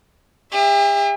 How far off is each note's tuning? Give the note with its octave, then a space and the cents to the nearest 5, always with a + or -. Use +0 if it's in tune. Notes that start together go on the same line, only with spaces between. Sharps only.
G4 +45 E5 +0